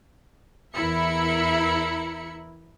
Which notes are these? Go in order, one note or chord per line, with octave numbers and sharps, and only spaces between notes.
E2 E4 A#4 E5 B5 C#7